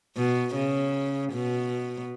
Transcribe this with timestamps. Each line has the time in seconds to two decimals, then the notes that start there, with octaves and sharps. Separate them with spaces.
0.17 B2
0.55 C#3
1.32 B2